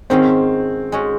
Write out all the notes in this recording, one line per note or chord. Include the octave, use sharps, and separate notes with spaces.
G#2 D#3 G#3 C4 C#4 F4
G#3 C#4 F#4